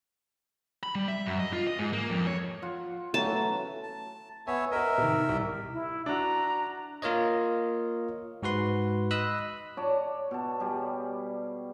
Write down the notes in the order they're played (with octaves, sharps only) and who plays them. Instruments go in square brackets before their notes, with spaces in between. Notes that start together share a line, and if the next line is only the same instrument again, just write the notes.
[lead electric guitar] B5
G3
E5
F#2
D#5
F4
D#5
G#2
A#3
F2
C#5
[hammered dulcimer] F4 F#5
[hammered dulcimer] E3 F#3 C#4 [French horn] A3 [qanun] A5
[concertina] A5
[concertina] B3 C#5 E5 [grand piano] G#5
[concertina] A#4 E5 [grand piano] B4 D#5
[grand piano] C3 D#3
C2
[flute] E4
[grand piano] D4 F#4 [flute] A#5
[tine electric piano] A#3 F4 A#4 C#5 D#5
G#2 F#4 B4 C6
D#5 B5 D#6 E6 F#6
[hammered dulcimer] C#5 D5 A5
B2 A5
G3 G4 G#4